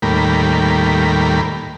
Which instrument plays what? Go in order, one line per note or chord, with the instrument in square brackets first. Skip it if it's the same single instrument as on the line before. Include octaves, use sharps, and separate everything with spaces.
[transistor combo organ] D#2 A2 G3 A#3 B5